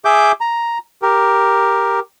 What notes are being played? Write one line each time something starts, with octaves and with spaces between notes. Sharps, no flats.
G#4 E5 D6 G6
A#5
G4 A#4